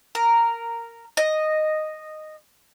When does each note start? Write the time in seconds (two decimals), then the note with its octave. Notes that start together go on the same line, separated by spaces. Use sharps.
0.15 A#4
1.17 D#5